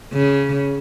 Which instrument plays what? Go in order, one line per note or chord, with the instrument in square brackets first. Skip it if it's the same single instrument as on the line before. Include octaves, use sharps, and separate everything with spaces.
[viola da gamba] C#3